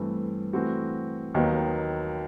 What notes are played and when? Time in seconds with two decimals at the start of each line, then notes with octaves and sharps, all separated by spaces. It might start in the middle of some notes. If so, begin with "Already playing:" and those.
Already playing: G2 E3 A3 C4
0.53 E3 A3 C4 F#4
1.34 D#2 D#3 F#3 B3